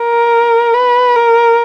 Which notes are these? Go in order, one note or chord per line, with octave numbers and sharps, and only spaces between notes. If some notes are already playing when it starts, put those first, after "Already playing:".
Already playing: A#4
B4
A#4